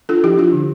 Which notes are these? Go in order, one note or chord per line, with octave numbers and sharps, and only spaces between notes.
D4 F4 A4
F3 E4 G4
D4 F4
D3